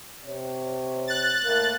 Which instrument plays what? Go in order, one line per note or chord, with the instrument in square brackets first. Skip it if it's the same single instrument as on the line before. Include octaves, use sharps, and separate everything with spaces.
[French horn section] C3 C#5
[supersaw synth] F#6 A6
[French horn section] A2 A#3